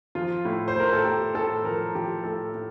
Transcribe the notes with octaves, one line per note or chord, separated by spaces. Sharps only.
F3 F4
A2
C5
A2 A#4
A4
A2 G4
A2 A4
F3 A#4
F3 G4
A2 A4
A2